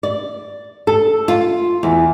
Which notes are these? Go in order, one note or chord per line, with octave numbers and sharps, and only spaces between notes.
D5
A4
F4
E2